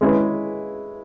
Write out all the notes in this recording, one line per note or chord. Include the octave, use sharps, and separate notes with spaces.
G#3 C#4 E4 G#4 B4